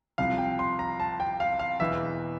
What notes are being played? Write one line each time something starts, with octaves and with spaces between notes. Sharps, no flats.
C2 C3 F3 F5
G5
C6
A#5
A5
G5
F5
F5
E1 E2 E3 E5